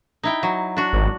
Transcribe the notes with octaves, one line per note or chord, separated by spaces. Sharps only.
D#4 E4 G5
F#3
D4 F#4
G#1